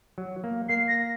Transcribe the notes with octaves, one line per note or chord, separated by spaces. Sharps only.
F#3
A#3
A#3 C7
A#6